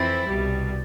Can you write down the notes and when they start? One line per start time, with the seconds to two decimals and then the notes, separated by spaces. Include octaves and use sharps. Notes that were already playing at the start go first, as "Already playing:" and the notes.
Already playing: F2 E3 C4 E4 A6
0.28 C2 B2 G3